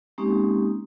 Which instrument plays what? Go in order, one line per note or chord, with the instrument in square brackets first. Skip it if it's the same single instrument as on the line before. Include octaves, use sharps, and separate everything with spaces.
[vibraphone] G#3 A#3 C4 C#4 D#4 G4